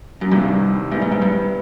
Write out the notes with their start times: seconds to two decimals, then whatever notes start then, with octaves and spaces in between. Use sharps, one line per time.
0.21 F#2
0.31 C2 G2 C3 D#3
0.91 G#2 G3 B3 E4
1.02 G#2
1.12 G#2
1.22 G2